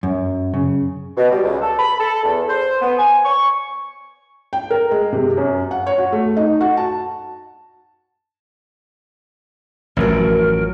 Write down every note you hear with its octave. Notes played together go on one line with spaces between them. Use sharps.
F#2
C#3
B2
G3
C#2
A4
B5
A4
E2
C5
B3
G#5
C#6
G5
A#4
G#3
C3
F#2
F#5
C#5
F#4
A3
D#4
F#4
A5
A1 F#2 A2 F3 F#3 A#4